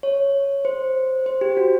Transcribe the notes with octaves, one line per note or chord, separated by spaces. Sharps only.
C#5
C5
C5
G4
F#4